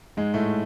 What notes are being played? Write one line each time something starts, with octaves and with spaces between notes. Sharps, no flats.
G#2 G#3
A2 A3